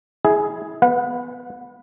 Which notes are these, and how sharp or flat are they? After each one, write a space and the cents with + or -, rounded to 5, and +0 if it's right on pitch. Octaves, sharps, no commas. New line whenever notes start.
E4 -20 G#4 +5
B3 +0 B4 +0 F#5 -40